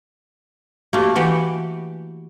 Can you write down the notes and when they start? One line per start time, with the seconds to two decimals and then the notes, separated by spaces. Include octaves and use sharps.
0.93 A3 A#3 F#4 G4
1.16 E3 F#4 G4 B4